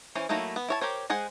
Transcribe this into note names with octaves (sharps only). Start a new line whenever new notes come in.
E3 C#4 C5
F#3 A3 A#3 D#4 E4
B3
E4 C#5 A5
G4 A#4 C5 C#5
G#3 G#4 C5 F#5